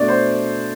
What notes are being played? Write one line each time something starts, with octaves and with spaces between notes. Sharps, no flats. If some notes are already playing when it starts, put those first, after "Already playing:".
Already playing: B2 A3 D4 D5
C5